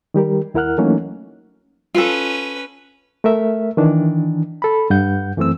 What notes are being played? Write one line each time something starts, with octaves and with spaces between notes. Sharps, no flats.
D#3 G3 G4 A#4
D#2 E4 A#4 F#5 F6 F#6
E3 F#3 A3 A#3 C#4 D#4
C#4 F4 A4 B4
A3 A#4 E5
D#3 E3 D4
A4 B5
G2 F#5 G6
F#2 E3 A3 C4 E6